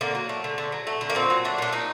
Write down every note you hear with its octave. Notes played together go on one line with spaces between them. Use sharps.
D3 A#3
F#3
A3
D3
D3
F#3
A3
D3
A#3
A#2 C4
F#3
A3 D4
A#2 D4
A#2 D#4